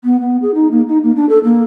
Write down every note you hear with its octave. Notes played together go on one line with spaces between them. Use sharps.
B3
B3
G#4
D#4
A#3
D#4
A#3
D4
A4
A#3